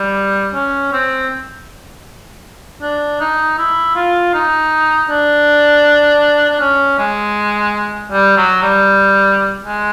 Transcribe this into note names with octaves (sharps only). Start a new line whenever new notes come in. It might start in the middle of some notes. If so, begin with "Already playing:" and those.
Already playing: G3
C#4
C4
D4
D#4
E4
F4
D#4
D4
D4
C#4
G#3
G3
F#3
G3
G#3